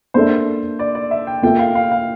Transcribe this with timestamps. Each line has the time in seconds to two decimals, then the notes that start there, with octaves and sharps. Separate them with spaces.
0.14 A#3 D4 A4 C5 E5
0.79 D5
0.95 D5
1.11 E5
1.27 G5
1.42 A#3 F4 A4 E5 G5
1.59 F5
1.75 F5
1.91 F5